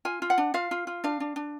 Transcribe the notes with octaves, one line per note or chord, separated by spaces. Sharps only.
F4 G#5
F4
F#5
D4
F4 F5
F4
F4
D4 F5
D4
D4